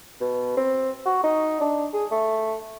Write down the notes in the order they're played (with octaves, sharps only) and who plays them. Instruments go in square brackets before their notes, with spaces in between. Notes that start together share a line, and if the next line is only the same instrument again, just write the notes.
[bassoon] B2
C4
F#4
D#4
D4
G#4
A3